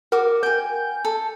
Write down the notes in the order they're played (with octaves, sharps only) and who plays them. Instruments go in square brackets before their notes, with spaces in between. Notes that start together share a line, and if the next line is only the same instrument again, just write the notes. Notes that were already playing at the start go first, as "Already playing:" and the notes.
[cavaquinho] F#4 D6 [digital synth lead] A#4
[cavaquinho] G5 G#5 [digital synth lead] G6
[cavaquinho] A4